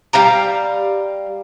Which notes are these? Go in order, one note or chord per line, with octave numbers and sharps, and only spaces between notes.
G3 F5 G5 A#5